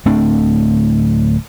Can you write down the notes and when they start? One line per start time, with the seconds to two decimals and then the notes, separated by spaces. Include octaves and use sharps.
0.05 D1 A3 C4 D4